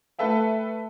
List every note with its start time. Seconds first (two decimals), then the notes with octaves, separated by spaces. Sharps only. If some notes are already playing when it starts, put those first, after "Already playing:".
0.19 A3 A4 B4 E5 G5